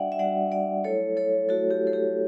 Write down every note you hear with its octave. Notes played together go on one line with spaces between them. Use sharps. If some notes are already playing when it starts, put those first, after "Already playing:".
Already playing: G3 D4 F#4 D5 E5 F#5 G5
E5
G3 D4 F#4 D5 F#5
D5 F#5
F#3 A3 E4 A4 C#5
A4 C#5
F#3 A3 E4 F#4 A4
G4
A4
G4